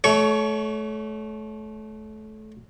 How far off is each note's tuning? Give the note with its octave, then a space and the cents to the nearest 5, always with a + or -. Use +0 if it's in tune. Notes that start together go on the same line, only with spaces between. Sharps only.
A3 -25 C#5 +25 C#6 +0